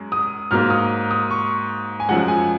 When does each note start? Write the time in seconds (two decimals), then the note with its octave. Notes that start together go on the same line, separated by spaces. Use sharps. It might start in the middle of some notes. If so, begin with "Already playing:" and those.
Already playing: F#2 G#3
0.12 D#6
0.51 G#2 F#3 A#3 F6
0.70 D#6
1.11 D#6
1.31 C#6
2.00 G#5
2.09 F#2 F3 G#3 F#5
2.28 G#5